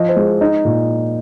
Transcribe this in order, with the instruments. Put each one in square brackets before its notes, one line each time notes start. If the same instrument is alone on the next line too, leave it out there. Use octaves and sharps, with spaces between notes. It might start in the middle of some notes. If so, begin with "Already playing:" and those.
Already playing: [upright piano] F3 D#5
C5
G#3
D#4
A#2